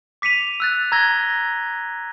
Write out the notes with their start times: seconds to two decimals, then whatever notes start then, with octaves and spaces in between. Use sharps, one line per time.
0.22 D6 B6 C#7 D#7 F7
0.60 E6 F#6 A6
0.92 A#5 E6 F#6 G#6 A#6 G7